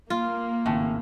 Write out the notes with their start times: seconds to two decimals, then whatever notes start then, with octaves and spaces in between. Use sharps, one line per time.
0.10 A#3 F4
0.66 G#1 A2 C#3